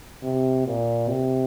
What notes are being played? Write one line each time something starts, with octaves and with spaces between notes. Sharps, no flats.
C3
A#2
C3